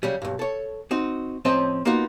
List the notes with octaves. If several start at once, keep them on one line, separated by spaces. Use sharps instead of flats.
C#3 F#3 G3
B1 G2
A4 C#5
C4 D#4 F#4
A2 F3 C4 C#4 C5 D#5
A#3 B3 D#4 F4 F#4